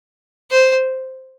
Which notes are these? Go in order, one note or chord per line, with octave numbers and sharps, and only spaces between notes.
C5